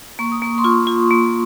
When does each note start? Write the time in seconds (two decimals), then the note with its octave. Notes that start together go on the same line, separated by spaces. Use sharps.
0.19 A#3 C#6
0.32 D#6
0.42 A#3 C#6
0.58 C6
0.64 F4 C#6
0.87 F4
1.11 A#3